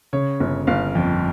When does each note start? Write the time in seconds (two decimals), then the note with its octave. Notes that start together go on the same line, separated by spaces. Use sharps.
0.13 C#3 C#5
0.40 G1
0.67 G1 F5
0.95 F2